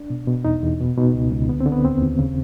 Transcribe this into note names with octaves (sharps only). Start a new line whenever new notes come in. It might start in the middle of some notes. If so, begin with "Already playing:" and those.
Already playing: D4
B2
B2
E2 D#4
E2
B2
B2 D#4
C#2
C#2
D3 B3
C4
D3
B3
D#2 C4
D#2
C#3